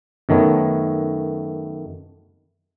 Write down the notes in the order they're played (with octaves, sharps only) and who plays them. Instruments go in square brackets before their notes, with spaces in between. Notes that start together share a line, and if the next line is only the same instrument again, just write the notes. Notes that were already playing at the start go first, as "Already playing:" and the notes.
[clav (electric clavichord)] F#2 D#3 A3 B3 C#5